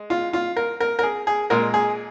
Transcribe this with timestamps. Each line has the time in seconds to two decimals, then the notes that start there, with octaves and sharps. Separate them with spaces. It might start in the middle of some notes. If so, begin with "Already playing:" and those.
Already playing: G#3
0.10 F4
0.33 F4
0.56 A#4
0.80 A#4
0.99 A#4
1.03 G#4
1.27 G#4
1.50 A#2 G#3 A#4
1.74 G#4